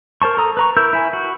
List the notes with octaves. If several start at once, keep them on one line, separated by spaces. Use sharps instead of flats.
A#4 C5 A5 C#6
A4 A#5 D#6
B4 A#5 C#6
E4 A#4 E6 G6
E4 G#5
F#4